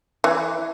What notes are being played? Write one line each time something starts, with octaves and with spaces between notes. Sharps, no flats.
E3